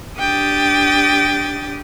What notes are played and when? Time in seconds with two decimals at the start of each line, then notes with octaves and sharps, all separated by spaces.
0.18 D4 G4 G5 D#6 A6